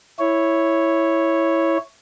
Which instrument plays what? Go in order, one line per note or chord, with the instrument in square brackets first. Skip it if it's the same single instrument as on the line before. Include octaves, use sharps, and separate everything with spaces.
[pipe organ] E4 C#5